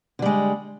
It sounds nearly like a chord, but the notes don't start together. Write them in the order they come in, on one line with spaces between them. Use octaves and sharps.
D3 G3 G#3